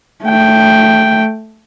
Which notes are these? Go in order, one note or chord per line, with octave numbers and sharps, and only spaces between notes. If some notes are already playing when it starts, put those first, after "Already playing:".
A3 G5